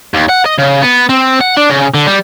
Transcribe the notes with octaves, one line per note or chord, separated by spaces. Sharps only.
D#2
F#5
D#5
C#3
B3
C4
F#5
D4
C#3
D3
G3